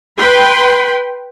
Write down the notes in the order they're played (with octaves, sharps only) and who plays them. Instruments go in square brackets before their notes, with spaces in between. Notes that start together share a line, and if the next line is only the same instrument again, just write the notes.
[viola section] B4 G5 B5 C6